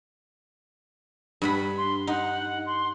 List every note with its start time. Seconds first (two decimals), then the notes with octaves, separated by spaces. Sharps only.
1.42 G2 F#5 B5
1.77 C6
2.07 D#4 F#5
2.66 C6